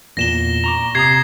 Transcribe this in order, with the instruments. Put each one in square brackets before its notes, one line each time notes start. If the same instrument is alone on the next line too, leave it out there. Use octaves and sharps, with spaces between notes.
[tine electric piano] E2 A#2 [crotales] A#6 E7 G7
[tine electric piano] A#5 C#6 D6
[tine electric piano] C3 A#5 D#6 [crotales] G#6 C7